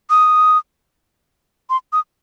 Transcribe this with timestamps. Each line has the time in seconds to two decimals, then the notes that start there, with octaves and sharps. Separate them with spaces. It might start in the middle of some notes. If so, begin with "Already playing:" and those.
0.10 D#6
1.70 C6
1.93 D#6